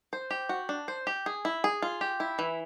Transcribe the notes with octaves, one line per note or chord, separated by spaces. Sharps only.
C5
G4
F#4
D4
C5
G4
G#4
E4
G#4
F4
G4
E4
E3